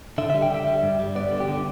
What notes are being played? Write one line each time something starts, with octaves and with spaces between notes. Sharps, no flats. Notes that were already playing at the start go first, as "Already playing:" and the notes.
D3 E5
E5
G3
G5
D3 E5
G3
G2
G3
B3 D5
D3
G4
D3